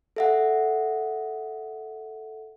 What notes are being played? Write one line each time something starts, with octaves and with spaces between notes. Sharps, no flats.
A4 E5 F#5